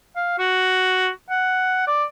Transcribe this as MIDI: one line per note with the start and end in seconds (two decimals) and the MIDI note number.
0.16 0.34 77
0.39 1.08 66
1.30 1.83 78
1.87 2.04 74